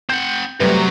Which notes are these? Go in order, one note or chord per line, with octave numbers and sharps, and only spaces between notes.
C4 F#5 G6
F#2 C3 F#3 G3 A3 B4